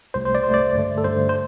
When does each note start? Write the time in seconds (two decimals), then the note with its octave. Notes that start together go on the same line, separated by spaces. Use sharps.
0.14 C2 C3 A3 C5
0.25 C5
0.35 D5
0.44 C2 C3 A3 C5
0.54 D5
0.75 G2 D3 A3
0.98 A4
1.04 G2 D3 A3 C5
1.29 C5